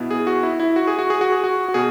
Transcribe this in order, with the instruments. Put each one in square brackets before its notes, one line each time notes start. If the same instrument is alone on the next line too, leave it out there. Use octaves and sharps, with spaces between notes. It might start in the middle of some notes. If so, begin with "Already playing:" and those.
Already playing: [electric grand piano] B2 B3 E4
G#4
F#4
E4
E4
F#4
G#4
F#4
G#4
F#4
G#4
F#4
F#4
B2 B3 G#4